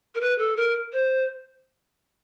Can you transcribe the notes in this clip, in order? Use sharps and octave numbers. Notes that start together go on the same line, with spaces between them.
A#4
B4
A4
A#4
C5